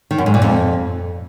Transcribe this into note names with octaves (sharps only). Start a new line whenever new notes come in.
D#3
F#2
G#2
A#2
F2